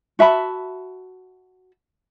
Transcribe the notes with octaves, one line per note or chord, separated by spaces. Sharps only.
F#4 E5 A5 B5